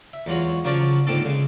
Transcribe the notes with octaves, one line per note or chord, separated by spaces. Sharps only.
E5
E2 F#3 G#3 F4 F#4 C#5
C#3 F3 F#3 A#4 C#5 D5
G#2 D3 A#3 C4 F4 A4
C#3 G#3